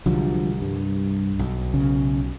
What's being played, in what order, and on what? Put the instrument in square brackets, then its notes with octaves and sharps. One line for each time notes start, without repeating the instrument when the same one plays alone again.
[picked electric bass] C2 [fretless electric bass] D3 F3 F#3
[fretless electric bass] G2
[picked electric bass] B1
[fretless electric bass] C#3